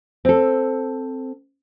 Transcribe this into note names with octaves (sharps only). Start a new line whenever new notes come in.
C4 A4